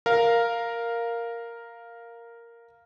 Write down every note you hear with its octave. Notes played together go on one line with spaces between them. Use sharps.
A#4 F5